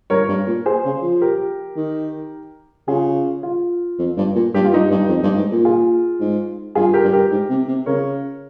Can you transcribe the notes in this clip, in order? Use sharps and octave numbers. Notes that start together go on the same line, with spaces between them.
G2 A#4 C#5
G2
A#2
G#4 C5
C#3
F3
G4 A#4
D#3
C#3 F4 G#4
F4
F2
G2
A#2
G2 G4
F4
G2 D#4 G4
G2
F2
G2
G#2
A#2
F4 G#4
G#2
G2 F4 G#4
G4 A#4
G2
G4 A#4
G#2
C3
C3
C#3 A#4 C#5